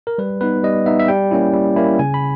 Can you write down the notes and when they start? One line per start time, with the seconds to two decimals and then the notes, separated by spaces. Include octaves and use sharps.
0.07 A#4
0.18 G3 B4
0.41 B3 D#4 B4
0.63 G3 D#5
0.86 B3 D#4 E5
0.99 E5
1.08 G3 G5
1.31 A#3 C#4 E4
1.53 G3
1.76 A#3 C#4 E4
1.99 C#3 G#5
2.14 B5